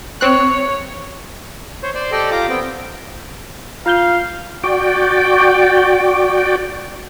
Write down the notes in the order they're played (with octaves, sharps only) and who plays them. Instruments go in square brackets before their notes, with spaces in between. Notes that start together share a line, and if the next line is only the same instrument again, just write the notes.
[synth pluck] C4 F#6 [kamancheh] C#5
[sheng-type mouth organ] C5 C#5
C5 D5
G4 A4 D5 D#5 G5
F4 G4 A#5 D6
B3 C4 G5
[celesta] F4 G6 G7 [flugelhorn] F5
[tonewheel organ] F#4 D5 G5